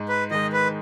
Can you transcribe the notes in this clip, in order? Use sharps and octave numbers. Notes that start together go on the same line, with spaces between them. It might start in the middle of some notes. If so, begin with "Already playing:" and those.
Already playing: G#2
B4
D#3 G#3 D#5
B4